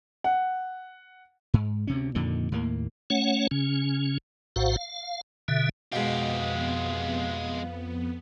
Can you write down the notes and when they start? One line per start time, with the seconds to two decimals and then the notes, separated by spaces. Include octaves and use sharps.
0.24 F#5
1.54 G#2
1.87 D2 C3 C#4
2.15 F2 A#2 D3 D#3
2.52 D#2 A2 A#3
3.10 A3 C#4 C#5 F#5
3.51 C#3 C#4
4.56 A#1 A2 F#4 C5 F5 F#5
4.77 F5
5.48 B2 D3 E5
5.93 F2 G#2 B2 G#3 B3 G4 F5